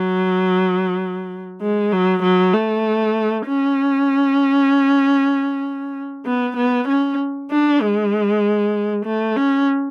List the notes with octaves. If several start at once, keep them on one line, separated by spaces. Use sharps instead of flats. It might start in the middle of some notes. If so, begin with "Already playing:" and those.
Already playing: F#3
G#3
F#3
F#3
A3
C#4
B3
B3
C#4
D4
G#3
A3
C#4